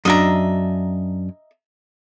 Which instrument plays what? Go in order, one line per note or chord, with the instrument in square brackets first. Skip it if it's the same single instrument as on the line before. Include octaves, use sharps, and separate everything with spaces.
[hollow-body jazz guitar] F#2 D4 [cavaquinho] D#5 E5 A#5